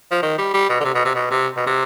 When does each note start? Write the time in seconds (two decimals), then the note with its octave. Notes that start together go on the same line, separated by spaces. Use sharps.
0.11 F3
0.22 D#3
0.38 G3
0.54 G3
0.69 B2
0.80 D3
0.84 C3
0.94 B2
1.05 C3
1.15 B2
1.30 C3
1.57 B2
1.66 C3